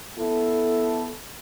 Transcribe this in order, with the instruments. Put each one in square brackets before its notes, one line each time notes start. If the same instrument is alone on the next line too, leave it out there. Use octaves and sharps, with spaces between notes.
[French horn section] B3 E4 A4